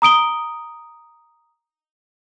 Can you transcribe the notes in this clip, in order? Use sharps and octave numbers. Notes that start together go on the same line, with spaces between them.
A#5 D#6 D7 G7